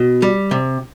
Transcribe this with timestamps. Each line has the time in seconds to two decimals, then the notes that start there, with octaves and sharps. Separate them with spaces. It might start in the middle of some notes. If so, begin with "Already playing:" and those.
Already playing: B2
0.22 G3
0.51 C3